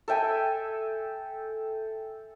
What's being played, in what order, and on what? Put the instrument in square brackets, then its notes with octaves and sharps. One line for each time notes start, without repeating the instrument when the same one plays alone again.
[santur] A4 E5 G5 G#5